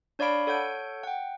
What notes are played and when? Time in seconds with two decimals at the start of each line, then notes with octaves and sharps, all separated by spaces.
0.19 D4 C#5 D5 F5 B5 D7
0.47 A4 C#5 F#5 G6 D7
1.04 F#5 G5